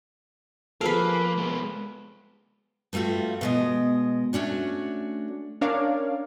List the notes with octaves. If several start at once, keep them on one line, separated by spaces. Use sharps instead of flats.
F3 A#3 G#4 A4 B4 F5
G#3 B3
G2 G3 A3 F4 F#4
B2 G#3 D#5
A3 C#4 D4 F#4
C#4 D4 A#4 C#5 D5 F5